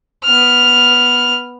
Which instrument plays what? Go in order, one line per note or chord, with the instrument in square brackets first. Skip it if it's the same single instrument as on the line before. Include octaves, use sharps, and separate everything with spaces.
[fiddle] B3 F6